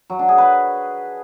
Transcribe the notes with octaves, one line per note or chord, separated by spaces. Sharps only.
F#3
D4
G#4
B4